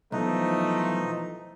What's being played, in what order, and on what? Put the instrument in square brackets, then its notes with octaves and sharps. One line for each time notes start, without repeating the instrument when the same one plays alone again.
[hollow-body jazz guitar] B1 [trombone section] E3 F3 [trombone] A3 [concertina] D#4